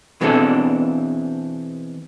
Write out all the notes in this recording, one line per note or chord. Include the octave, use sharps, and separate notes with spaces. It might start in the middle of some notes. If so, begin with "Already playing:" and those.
B2 E3 G#3 C4 D4 A4